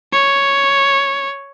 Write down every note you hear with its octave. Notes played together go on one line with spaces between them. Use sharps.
C#5